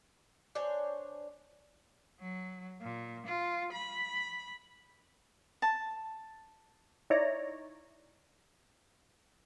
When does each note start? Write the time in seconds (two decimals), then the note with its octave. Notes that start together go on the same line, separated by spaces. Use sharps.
0.55 D4 C5 C#5 G#5
2.19 F#3
2.80 A#2
3.24 F4
3.71 B5
5.62 A5
7.10 D#4 E4 C#5 D5 A#5